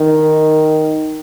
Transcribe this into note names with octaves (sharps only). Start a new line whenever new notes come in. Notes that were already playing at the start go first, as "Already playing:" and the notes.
Already playing: D#3